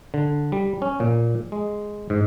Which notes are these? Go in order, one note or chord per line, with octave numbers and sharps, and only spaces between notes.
D3
G3
C#4
A#2
G#3
G#2